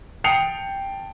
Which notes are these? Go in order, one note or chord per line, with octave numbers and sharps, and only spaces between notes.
G5 A5 D#6 C7 C#7 F7